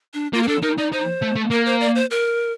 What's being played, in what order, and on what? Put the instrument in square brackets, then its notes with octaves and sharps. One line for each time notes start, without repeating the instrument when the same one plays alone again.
[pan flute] D4
[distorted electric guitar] A#3 [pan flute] F4
[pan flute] A#4
[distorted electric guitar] D4 [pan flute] A4
[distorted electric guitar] D#4 [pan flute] A#4
[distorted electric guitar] D#4 [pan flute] D5
[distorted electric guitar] D#4 [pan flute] C5
[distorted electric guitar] A3
A3
[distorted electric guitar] A#3 [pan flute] A#4
[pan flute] C5
D5
C5
A#4